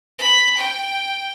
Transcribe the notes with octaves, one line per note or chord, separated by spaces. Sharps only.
B5
G5